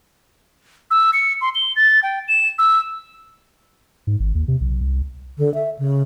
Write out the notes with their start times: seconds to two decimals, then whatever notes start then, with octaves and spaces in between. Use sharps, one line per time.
0.91 E6
1.13 C#7
1.41 C6
1.55 G7
1.76 A6
2.03 G5
2.28 E7
2.58 E6
4.07 G#2
4.20 G#1
4.35 D#2
4.48 C3
4.61 B1
4.81 C2
5.38 D3
5.54 E5
5.79 C#3